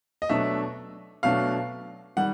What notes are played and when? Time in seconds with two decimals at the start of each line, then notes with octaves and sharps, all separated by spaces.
0.22 D#5
0.29 B2 F#3 A3 D4 E5
1.23 B2 F#3 A3 D4 F5
2.16 D#3 G3 F#5